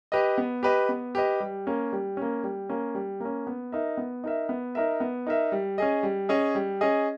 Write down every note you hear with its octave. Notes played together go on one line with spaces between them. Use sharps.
G4 B4 D#5
B3
G4 B4 D#5
B3
G4 B4 D#5
G3
A#3 C#4
G3
A#3 C#4
G3
A#3 C#4
G3
A#3 C#4
B3
D#4 A#4 E5
B3
D#4 A#4 E5
B3
D#4 A#4 E5
B3
D#4 A#4 E5
G3
C#4 G#4 D#5
G3
C#4 G#4 D#5
G3
C#4 G#4 D#5